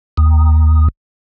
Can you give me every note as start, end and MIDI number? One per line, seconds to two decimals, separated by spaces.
0.17 0.88 39